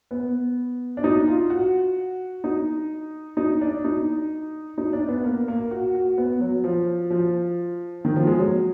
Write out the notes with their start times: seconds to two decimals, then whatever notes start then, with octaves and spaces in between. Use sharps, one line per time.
0.11 B3
0.97 D4
1.04 D#4
1.28 F4
1.50 F#4
2.44 D#4
3.37 D#4
3.61 D4
3.84 D#4
4.78 D#4
4.93 D4
5.08 B3
5.24 A#3
5.48 A#3
5.71 F#4
5.95 F#4
6.18 B3
6.41 F#3
6.64 F3
7.10 F3
8.05 D#3
8.16 F3
8.27 G#3
8.39 F#3